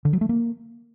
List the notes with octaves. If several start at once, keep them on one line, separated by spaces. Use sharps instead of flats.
D3
F#3
A3
A#3